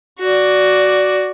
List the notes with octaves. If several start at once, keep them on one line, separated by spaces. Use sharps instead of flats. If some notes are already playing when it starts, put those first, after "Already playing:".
F#4 D5